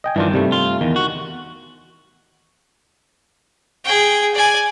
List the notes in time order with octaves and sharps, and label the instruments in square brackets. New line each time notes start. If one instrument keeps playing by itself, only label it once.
[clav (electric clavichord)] D#5 G5 G#5
[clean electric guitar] G2 D#3 [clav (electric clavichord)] E3 D4 F4
[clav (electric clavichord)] C3 G3 A3
[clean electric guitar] F4
[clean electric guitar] E2 [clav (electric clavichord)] D#3
[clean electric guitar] F#4
[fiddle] G#4 G5
D5 G#5